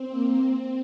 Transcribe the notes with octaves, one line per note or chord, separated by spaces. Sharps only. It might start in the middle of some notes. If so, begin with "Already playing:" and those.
Already playing: C4
A#3
C4